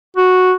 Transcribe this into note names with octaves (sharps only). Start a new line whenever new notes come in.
F#4